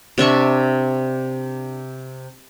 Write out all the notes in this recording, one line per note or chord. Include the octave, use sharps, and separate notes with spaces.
C3 D4 E5 C#6